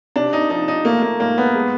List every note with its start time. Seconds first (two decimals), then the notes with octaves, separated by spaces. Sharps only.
0.16 C3 D4
0.33 D#4
0.50 F3 D#4
0.68 D#4
0.85 A3 A#3
1.02 A#3
1.20 G#2 A#3
1.38 B3
1.54 G#3